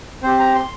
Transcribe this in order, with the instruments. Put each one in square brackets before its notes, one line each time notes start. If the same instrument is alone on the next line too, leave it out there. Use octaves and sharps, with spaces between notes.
[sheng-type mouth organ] C4 G4 C5
A#5
C6